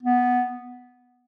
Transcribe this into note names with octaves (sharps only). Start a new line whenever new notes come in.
B3